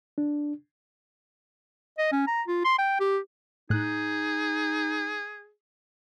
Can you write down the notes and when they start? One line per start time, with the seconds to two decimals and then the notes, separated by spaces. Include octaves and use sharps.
0.18 D4
1.98 D#5
2.12 C#4
2.27 A#5
2.47 F4
2.65 C6
2.78 G5
3.00 G4
3.70 A2 D#4 G#4 F#6